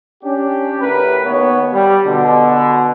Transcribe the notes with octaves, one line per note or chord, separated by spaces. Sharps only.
C#4 D4 G4
D2 A2 G4 A#4 B4
D#2 B3 C#5
G3
B2 D3